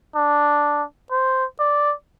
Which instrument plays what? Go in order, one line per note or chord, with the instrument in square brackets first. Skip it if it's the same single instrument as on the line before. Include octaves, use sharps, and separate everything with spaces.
[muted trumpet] D4
C5
D5